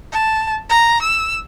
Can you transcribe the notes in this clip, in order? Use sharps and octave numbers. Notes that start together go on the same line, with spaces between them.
A5
A#5
E6